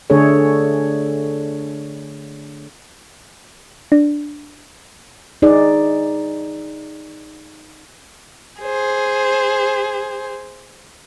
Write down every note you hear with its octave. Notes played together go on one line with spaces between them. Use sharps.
D3 A3 D4 G#4 A4 C#5
D4
D#4 G#4 D5
G#4 C5